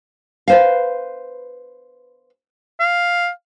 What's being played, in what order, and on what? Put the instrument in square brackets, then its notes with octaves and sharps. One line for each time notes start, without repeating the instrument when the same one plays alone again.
[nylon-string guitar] B4 C5 F5
[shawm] F5